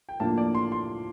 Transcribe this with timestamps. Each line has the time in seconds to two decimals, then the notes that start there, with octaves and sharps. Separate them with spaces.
0.09 G5
0.20 A2 F3 A#3 D4 A5
0.38 D5
0.55 C6
0.72 C6